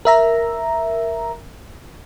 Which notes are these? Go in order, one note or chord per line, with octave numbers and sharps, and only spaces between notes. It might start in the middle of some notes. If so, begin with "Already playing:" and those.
A#4 E5 A#5